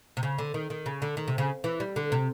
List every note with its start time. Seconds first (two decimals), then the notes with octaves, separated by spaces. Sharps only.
0.17 C3
0.23 C#3
0.38 D3
0.54 D#3
0.70 D#3
0.86 C#3
1.02 D3
1.17 D#3
1.28 C3
1.38 C#3
1.64 E3
1.80 G3
1.96 D3
2.12 C3